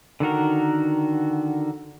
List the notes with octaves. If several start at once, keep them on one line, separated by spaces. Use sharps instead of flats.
D3 D#3 F#4 A#4